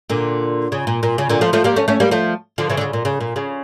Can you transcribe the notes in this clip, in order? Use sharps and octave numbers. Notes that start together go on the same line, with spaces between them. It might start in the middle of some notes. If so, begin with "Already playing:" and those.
A#2 D3
C#3
A#2
A#2
C#3
A#2 D3
F3 A3
F3 A3
G3 A#3
A3 C#4
A3 C#4
G3 A#3
F3 A3
D3 F3
C#3 E3
D3
C#3
A#2
C#3
A#2
C#3